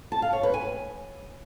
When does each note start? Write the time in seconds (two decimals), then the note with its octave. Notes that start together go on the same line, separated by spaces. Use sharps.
0.12 A5
0.22 F5
0.33 C#5
0.43 B4
0.54 G#5